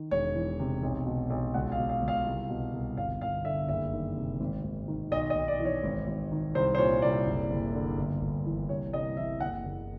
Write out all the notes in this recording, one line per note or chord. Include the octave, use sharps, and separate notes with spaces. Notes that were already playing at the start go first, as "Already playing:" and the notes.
Already playing: D#3
E1 C#5
E3
C3
B1
B2
B1
C#2 F#5
F5
B2
F5
C#2
F5
C2
B2
C2
G1 F5
G1 F5
D3 E5
F#1 E5
D#3
C3
G#1
G#1
D#3
B1 D#5
D#5
B1
D5
E3
C#5
G#1
G#1
D#3
C2 C5
C5
A#2 C#5
C2 D5
F#1
F#1
D3
G1
G1
E3
C2 C#5
C2 D#5
E3 E5
F#1 F#5
F#1